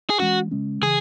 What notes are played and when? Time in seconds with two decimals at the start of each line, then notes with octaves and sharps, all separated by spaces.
0.10 G#4
0.20 E3 G#3 C#4 F#4
0.51 C#3 G#3 C#4
0.82 C#3 E3 G#4